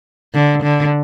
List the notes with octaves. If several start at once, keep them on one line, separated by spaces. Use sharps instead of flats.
D3
D3